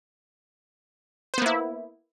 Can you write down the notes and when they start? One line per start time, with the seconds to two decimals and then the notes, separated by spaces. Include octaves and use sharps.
1.34 C5
1.38 B3
1.42 A#3
1.46 E4